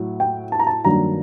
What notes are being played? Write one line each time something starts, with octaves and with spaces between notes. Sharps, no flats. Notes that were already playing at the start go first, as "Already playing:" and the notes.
Already playing: A2 F#3
G5
A5
A#5
A5
G2 D#3 F#3 A#3 D4 A#5